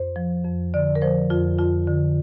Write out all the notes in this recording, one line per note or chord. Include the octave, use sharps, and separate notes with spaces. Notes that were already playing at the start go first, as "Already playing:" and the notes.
Already playing: F2 C5
F3
F2
D3 D5
A#4
F3 C5
F2 F4
F2 F4
D3